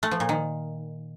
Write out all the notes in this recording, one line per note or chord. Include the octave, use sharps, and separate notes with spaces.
A3
F3
A#2
D#3